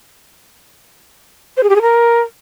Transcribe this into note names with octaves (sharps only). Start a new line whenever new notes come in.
C5
G#4
G4
G#4
A#4